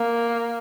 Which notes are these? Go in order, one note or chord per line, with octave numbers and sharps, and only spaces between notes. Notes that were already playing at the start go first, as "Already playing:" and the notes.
Already playing: A#3